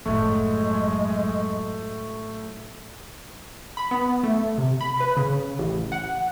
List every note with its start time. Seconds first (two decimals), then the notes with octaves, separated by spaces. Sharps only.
0.06 F#1 A2 F#3 G#3 A3
3.77 B5
3.91 B3
4.23 A3
4.58 C3
4.81 B5
5.00 B4
5.17 C#3
5.59 A1
5.92 F#5